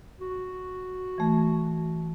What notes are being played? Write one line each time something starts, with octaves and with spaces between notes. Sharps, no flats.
F#4
E3 A3